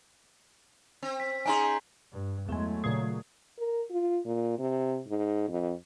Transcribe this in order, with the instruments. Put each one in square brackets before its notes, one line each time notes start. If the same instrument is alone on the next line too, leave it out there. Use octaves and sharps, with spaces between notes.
[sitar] C4
[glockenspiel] B6
[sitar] C#4 D#4 G#4 [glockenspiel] G#5 A#5 C6
[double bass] G2
[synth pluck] E2 G#3 [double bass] F#3 A3
[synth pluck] A#2 C#3 G#4
[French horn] A#4
F4
A#2
C3
G#2
F2